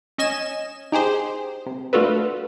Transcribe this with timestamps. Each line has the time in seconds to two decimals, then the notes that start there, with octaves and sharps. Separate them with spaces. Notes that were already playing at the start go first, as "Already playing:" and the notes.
0.18 C#4 D#5 G#5 E7
0.92 D#4 G4 G#4 C5
1.66 C3
1.93 A3 D4 F4 F#4 A4 B4